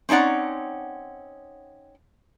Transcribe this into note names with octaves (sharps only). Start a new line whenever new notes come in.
C4 C#4 D#4 D5 F#5